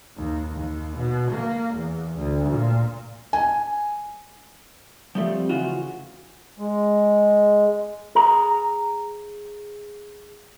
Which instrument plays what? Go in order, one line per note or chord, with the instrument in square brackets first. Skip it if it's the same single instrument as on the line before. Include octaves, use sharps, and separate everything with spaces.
[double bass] D#2
D#2
B2
A#3
E2
D2
A#2
[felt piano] G#5
[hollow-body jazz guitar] F3 G3 A3 C4
C#3 E3 F4 F#4
[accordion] G#3
[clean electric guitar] G#4 A#5